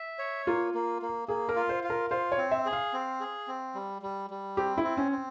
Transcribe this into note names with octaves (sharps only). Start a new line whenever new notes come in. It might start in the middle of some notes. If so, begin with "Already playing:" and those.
Already playing: E5
C#5
A#3 F4
A#3
A#3
A#3 G#4
A#4
F4
C5
F4
A#4
F4 C5
C#5
C4
E5
G#4
F5
C4
G#4
C4
G3
G3
G3
C4 G4
E4
C4
C#4
C4